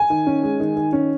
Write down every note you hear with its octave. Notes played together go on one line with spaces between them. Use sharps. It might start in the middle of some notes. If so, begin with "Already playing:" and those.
Already playing: G#5
D#3
C#4
G#3
D#3
D#3
C#4